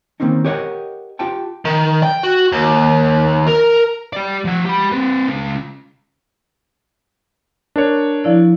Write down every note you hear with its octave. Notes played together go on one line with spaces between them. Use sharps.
D#3 A#3 C4 C#4 D#4
G4 A#4 C#5 D#5 F#5
F4 G4 F#5 G5 A5
D#3
G5
F#4
D#2
A#4
G4 D5
F3 F#5
G4 B5
C4 B4
C#2 C#4
D4 A#4 C#5
F3 E4 D5